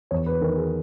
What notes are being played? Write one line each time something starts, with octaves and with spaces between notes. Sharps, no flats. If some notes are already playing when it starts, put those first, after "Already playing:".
E2 C#5
B4
D#3 A#4
G#4